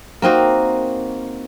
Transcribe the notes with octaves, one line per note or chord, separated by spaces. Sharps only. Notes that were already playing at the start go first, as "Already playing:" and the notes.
A#3 C4 D#4 F#4